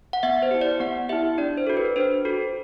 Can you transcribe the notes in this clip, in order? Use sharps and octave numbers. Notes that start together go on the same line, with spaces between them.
F#5
B3 E5
C5
E4 G4
D5
B3 F#5
E4 G4 E5
D4 D5
C5
F#4 A4
B4
D4 C5
F#4 A4